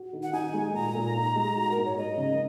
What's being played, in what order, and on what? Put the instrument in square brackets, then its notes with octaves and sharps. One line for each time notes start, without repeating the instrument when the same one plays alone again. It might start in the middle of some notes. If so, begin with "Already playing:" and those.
Already playing: [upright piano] F#4
D#3
[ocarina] F#5
[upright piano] D#4 [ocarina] G#5
[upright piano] G#3
[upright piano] A#2 [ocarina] A#5
[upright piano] A#2
D#4
G#3
F#4
[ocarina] A#4
[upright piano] G#2
[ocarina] C#5
[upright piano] G#3 [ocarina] D#5
[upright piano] C#3